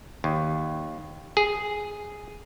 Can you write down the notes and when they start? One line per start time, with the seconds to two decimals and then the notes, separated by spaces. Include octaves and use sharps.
0.24 D#2
1.37 G#4